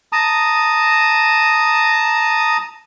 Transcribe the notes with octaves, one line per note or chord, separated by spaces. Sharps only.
A5 A#5 D#6